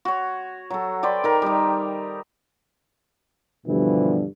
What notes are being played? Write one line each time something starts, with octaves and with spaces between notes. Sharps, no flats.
F#4 C#5
F#3 A4
B4 C5 D5 G5
D#3 A#4
G3 D#4
G2 B2 D3 E3 F3 G3